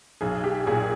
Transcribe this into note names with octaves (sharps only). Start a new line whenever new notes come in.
B1 G#4
G4
A#2 G#4